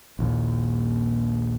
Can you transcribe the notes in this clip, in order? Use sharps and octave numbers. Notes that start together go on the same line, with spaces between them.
A#1 D#2